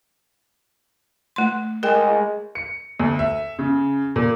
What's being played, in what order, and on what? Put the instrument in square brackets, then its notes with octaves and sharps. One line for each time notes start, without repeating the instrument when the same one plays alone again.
[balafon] A3 C6
[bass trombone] G#3 [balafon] A#4 G5
[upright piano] C#7
D2
E5
C#3
A#2